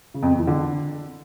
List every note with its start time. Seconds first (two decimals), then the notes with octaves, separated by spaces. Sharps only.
0.14 C#3
0.23 F2
0.31 E2
0.39 E3
0.47 D3